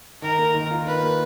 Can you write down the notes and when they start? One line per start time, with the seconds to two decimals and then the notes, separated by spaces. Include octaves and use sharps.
0.22 D#3 A#4
0.39 A#3
0.54 D#3
0.71 F4
0.87 D#3 B4
1.03 A#3